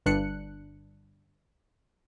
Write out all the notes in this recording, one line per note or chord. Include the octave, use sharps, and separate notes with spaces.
G1 G2 D4 F#6 C#7